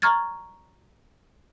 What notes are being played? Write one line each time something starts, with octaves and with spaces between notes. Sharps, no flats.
A#5 C#6 F6 G#6 A6